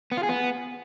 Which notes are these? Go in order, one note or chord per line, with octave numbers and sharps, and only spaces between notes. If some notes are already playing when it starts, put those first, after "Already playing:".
B3
F4
G#4
B3